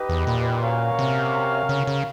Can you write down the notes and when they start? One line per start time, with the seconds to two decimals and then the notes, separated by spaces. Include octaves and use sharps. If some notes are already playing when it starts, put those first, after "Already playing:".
Already playing: D#4 G4 B4 D#5
0.09 E2
0.27 A#2
0.62 C#4 F#4 A#4 C#5 F5
0.99 C3
1.69 C#3
1.87 C#3